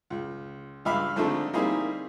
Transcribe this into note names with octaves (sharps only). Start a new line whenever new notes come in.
C#2
C#2 G2 E5 F5 B5
G#2 D3 F3 A3 C4 D#4
G3 A#3 C4 D#4 E4 G#4